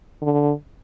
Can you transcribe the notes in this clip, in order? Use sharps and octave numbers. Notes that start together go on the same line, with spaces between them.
D3